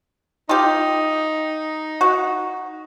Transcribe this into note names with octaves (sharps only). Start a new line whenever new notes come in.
D#4 F4 G4
F#4